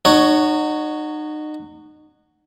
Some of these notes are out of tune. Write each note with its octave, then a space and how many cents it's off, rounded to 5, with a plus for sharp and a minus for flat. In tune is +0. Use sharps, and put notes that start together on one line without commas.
D#4 -35 F#4 +0 C#5 +10